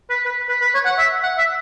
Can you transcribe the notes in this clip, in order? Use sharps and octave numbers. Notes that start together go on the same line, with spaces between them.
B4
B4
B4
B4
C#5
F#5
E5
F#5
E5